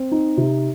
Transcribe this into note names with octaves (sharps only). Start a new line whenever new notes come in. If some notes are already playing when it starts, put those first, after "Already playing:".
Already playing: C4
D#4
C3